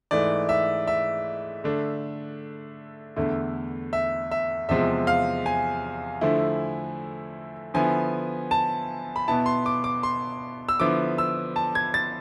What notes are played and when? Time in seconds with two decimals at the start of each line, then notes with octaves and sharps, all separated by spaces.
0.11 G#2 E3 A3 D5
0.49 E5
0.87 E5
1.64 D3 A3 D4
3.16 E2 D3 A3 E4
3.93 E5
4.31 E5
4.69 E2 C3 F3 G#3 E5
5.07 F5
5.46 G#5
6.21 D3 F3 A3 E4
7.74 D3 F3 B3 E4 G#5
8.51 A5
9.16 B5
9.28 B2 B3 E4 A5
9.46 C6
9.66 D6
9.84 D6
10.03 C6
10.69 E6
10.80 D3 F3 B3 E4 D6
11.18 E6
11.56 A5
11.75 G#6
11.94 A6